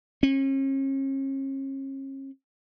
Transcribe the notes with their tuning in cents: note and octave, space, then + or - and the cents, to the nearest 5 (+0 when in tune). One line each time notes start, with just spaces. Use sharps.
C#4 -40